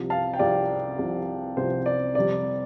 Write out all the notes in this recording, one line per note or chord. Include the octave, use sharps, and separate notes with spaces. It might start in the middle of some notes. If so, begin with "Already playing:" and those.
Already playing: C2 C3 F3
F5 A5
G5
C2 C3 F3 D5 F5
C2 C3 F3
C2 C3 F3 C5
D5
F2 C3 G3 D5